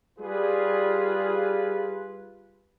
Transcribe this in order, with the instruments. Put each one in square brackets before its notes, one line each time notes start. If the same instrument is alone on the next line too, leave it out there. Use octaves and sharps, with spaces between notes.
[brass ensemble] G3 F4 G#4 B4